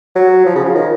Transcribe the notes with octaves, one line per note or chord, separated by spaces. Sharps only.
F#3
F3
C#3
F3
D#3